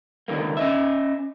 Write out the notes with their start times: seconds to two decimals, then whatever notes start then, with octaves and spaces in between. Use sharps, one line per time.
0.28 C#2 D3 D#3 A3 A#3
0.57 C#4 D#5 E5